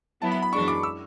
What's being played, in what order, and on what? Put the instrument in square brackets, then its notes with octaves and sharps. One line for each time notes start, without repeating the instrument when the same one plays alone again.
[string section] F#3 B3 E4 [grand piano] A5
[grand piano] B5
B5
[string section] F#2 E3 G#3 D4 [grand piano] C#6
[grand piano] D6
E6